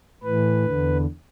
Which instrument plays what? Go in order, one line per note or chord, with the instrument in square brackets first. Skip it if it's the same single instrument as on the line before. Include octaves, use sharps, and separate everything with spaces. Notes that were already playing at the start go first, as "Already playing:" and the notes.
[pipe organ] A2 E3 B4
E2 D3